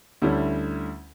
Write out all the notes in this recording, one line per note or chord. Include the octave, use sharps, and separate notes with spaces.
D2 D3 G3 C#4 E4